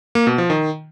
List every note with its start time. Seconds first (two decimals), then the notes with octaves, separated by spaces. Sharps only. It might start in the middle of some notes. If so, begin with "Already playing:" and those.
0.15 A#3
0.27 B2
0.38 F3
0.50 D#3